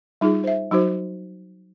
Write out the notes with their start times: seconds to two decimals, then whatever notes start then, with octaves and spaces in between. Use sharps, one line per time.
0.21 G3 D#4 F4 G#4
0.44 C5 E5
0.71 F#3 D#4 F#4 C5